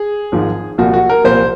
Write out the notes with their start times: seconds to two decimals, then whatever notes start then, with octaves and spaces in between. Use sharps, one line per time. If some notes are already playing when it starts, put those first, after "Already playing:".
Already playing: G#4
0.32 G#1 G#2 F3
0.78 C2 A#2 F3 F#4
0.94 F#4
1.10 A#4
1.24 C2 A#2 F3 C5